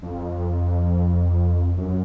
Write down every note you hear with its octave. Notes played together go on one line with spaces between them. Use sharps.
F2
F#2